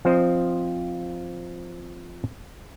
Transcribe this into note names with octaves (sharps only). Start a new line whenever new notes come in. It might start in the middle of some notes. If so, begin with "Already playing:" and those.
F3 C4 C5 D#5